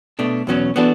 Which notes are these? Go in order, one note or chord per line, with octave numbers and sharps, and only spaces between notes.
B2 A3 D4
E2 B2 F#3 C#4
E3 B3 D4 F#4 A4